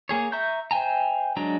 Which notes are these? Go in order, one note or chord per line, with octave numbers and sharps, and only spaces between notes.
A#3 G#4 C#5
E5 A#5 C#6 G6
C5 E5 G5 G#5 A#5
F#3 G#3 D4 A#5